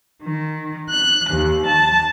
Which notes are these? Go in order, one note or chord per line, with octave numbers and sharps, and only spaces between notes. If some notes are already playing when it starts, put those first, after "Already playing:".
D#3
F#6
D#2
A5